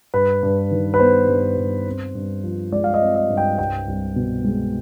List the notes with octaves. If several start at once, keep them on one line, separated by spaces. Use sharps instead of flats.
G2 B4
G2
D#3
B4
B3 C5
G2
G2
C4
G2
F3
G#3 D5
F5
D#5
C4
D#5
G2
G5
C2 G5
C2
B2
G#3